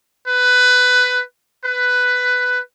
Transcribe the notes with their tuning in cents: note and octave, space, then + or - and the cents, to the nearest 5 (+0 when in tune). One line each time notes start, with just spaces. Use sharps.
B4 +15
B4 +10